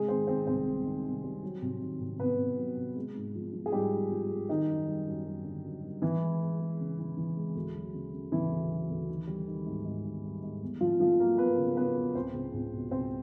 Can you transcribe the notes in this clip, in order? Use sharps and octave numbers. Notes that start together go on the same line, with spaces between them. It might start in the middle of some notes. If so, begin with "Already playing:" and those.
Already playing: C3 G#3 G#4
D#3 C4 C5
D#3 C4 C5
C2 C4 C5
C2
D#3
C2
G3
F#3
C3
D#3
C3
C3 B3 B4
C3
F#3
C3
G#3
G#2
F3
F3
G#4
G#2 G3 G4
G#2
F3
G#3
D#3 G3 D#4
F#2
G3
F#2
F#2
D3
F#2
G3
E3 E4
G#3
G#3
G#3
C#3
E3
E3
G#3
D2
F#3
C#3
C#3
C#3 E3 E4
D2
F#3
D2
D#3
G3
D#3
G#2
G#2
D#3
G3
G#2
E2
E2 F3 F4
F3 A3 F4
F#3 A#3 A#4
F#3 B3 B4
C#3
F#3 B3 B4
E2
C#2 C4 C5
C#2
C#2
B2
C#2 C4 C5